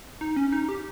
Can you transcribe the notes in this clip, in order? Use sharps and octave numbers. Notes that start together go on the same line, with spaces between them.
D#4
C#4
D#4
G4